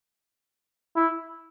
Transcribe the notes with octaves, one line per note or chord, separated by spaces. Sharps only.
E4